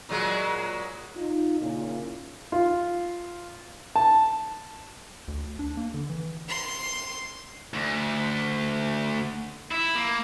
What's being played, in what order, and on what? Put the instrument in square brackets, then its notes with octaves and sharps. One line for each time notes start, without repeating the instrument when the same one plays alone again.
[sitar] A#2 F#3 G#3
[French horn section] D#4 F4
A#2 C#3 A#3 C#4 E4 F4
[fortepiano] F4
A5
[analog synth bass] D2
D4
A#3
D3
E3
[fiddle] C6
[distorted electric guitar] D2
E4
A#3